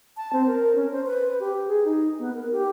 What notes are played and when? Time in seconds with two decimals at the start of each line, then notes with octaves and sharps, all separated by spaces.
0.17 A5
0.33 C4
0.47 A#4
0.75 C#4
0.91 C5
1.06 B4
1.40 G4
1.67 G#4
1.85 D#4
2.19 B3
2.34 A#4
2.52 G4